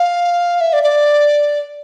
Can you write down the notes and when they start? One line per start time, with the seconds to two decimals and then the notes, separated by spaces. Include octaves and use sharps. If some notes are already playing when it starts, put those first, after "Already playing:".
Already playing: F5
0.61 E5
0.73 D5
0.84 D5